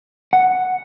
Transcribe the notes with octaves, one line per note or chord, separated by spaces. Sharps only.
F#5